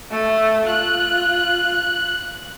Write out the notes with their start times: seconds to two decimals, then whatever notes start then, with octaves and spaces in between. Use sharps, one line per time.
0.11 A3
0.67 F4 F#6